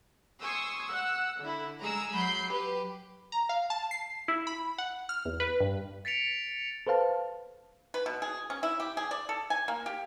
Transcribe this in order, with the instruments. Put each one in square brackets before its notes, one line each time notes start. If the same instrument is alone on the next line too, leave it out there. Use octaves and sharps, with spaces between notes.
[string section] G#5 C6 C#6 D#6 E6
F#5 E6
D3 E4
G#3 G#4 A#5 E6
F#3 B5 G6 C7
G4 B4
[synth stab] A#5
F5
A5
C7
E4
B5
F#5
F6
E2
B4
G2
[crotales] A6 B6 C#7 D7 F7
[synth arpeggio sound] A4 B4 C5 F5 A5
[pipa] B4
B2
G#4
C#4
E4
G4
G#4
D5
A4
G#5
A#3
G4